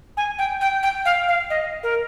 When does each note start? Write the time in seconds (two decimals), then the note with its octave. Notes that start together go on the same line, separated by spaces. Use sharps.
0.17 G#5
0.39 G5
0.61 G5
0.83 G5
1.05 F5
1.28 F5
1.50 D#5
1.83 A#4